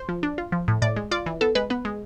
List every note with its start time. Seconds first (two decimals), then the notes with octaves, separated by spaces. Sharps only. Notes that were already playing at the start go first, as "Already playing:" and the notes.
Already playing: C5
0.09 F3
0.23 D4
0.38 F4
0.52 F3
0.68 A2
0.82 A2 D5
0.96 G#3
1.11 F4 D5
1.26 E3
1.41 B3 A4
1.55 G#3 B4
1.70 B3 B4
1.85 G#3